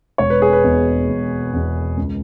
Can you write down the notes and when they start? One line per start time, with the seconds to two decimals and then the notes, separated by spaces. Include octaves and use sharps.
0.18 E1 C#5
0.30 B4
0.42 G#4
0.53 B4
0.63 E2 B2
1.08 E1
1.53 E2 B2
1.97 C#2